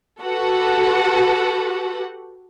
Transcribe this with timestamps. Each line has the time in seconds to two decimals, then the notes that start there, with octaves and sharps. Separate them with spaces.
0.22 F#4 G4 A4 B4 F#5